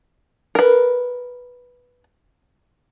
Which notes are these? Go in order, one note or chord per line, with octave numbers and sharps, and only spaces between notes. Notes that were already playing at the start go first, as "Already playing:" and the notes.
A#4 B4